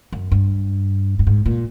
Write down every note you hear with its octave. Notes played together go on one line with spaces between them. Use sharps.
F#2
G2
G2
G#2
A#2